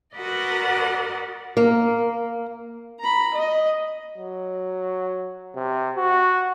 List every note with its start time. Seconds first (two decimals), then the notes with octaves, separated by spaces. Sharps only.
0.17 F#4 A#4 B4 D5 D#5 F#5
1.57 A#3
3.00 A#5 B5
3.34 D#5
4.18 F#3
5.56 C3
5.97 F#4